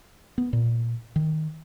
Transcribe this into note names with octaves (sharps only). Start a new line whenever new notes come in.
B3
A#2
D#3